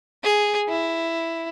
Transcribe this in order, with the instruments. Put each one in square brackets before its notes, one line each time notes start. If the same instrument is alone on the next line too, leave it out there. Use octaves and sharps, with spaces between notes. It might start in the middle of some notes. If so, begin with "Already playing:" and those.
[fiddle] G#4
E4